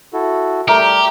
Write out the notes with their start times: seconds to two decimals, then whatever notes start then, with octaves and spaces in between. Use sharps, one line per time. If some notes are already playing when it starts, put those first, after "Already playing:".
0.14 E4 F#4 A4
0.68 G3 A3 G4 A#4